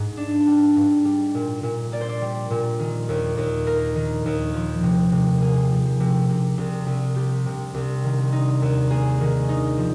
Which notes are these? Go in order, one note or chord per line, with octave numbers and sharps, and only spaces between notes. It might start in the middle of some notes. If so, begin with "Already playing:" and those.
Already playing: G#2
D4
G3
G#2
G3
A#2
A#2
A#3 D5
C5
D5
G3
A#2
D#3
D#2
D#2
A#3 A#4
D#3
D#2
F3
C3
C3
A#3 G#4
F3
C3
C3
C2
C2
G3 G4
C3
C2
D#3
D#4
D#2
A#3 G#4
D#3
D#4
F3